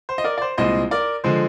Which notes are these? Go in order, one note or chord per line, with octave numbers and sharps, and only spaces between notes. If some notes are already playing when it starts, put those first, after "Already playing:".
C5
D#5
A#4 D5
D5
C5
C2 A#2 G#3 C5 D#5
A#4 D5
D3 F3 G#3 C5